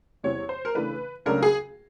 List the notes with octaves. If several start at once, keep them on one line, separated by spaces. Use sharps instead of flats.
E2 C3 E3 G3 C4 C#5
C5
A#4
C#3 E3 A3 D4 B4
C#2 C#3 F#3 A3 D4 A#4
G#4